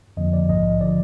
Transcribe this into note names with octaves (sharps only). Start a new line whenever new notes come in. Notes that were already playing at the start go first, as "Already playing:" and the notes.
F2 D3 F3 A#3 D#5
D5
A#1 G#2 F3 D#5
D3 F3 D5